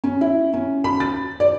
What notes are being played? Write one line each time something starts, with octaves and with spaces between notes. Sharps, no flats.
C#4
E4
C#4
B5
A6
D5